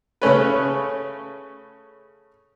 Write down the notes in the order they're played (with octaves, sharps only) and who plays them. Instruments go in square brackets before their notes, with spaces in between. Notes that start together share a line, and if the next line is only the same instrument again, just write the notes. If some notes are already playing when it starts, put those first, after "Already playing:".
[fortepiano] C#3 A3 C#4 B4